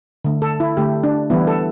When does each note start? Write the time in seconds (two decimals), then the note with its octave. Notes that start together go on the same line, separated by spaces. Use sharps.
0.25 D3 A3
0.42 A4
0.60 E4
0.77 D3 A3 G4
1.04 D4
1.30 E3 G3 B3 E4
1.47 A4